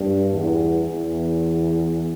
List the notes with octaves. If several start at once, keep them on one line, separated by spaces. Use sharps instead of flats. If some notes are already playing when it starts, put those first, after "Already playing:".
Already playing: G2
E2
E2